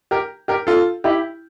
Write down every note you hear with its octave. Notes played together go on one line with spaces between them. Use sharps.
G4 A#4
G4 A#4
F4 A4
E4 G4